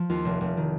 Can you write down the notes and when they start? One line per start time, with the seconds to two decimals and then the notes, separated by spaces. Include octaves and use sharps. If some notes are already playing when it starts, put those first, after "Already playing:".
Already playing: F3 C5
0.09 D#2 F4
0.25 F1
0.41 F1
0.57 D#3